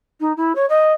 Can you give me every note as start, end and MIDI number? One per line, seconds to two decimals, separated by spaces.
0.20 0.32 63
0.37 0.52 64
0.55 0.65 73
0.69 0.92 75